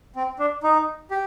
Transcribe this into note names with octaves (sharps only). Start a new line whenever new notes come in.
C4
D4
D#4
G4